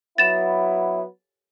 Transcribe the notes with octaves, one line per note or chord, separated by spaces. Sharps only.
F#3 B3 E4 A6 E7